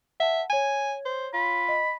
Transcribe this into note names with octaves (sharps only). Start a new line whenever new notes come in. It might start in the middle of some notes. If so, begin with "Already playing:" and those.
E5 F#5 A5
C#5 G#5 G#6
C5
F4 B5
D#5